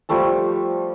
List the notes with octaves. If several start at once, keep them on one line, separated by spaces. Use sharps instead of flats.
F3 G3 A3 A5